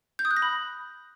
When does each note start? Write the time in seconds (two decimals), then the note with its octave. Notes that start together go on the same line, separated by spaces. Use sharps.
0.19 G6
0.25 D#6
0.31 F#6
0.37 A#6
0.42 B5